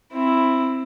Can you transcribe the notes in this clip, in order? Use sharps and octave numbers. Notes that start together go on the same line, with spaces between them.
C4 E4